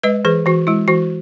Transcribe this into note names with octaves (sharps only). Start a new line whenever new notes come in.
G#3 B4 D#5
E3 G#4 B4
E3 F#4
G#3 E4
E3 F#4